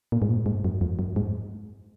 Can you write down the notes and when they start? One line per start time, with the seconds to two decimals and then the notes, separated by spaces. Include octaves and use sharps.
0.12 A#2
0.22 G#2
0.29 A#2
0.46 G#2
0.64 F#2
0.81 F2
0.99 F#2
1.16 G#2